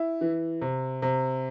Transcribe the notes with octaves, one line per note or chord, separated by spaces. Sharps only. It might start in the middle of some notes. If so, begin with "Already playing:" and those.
Already playing: E4
E3
C3
C3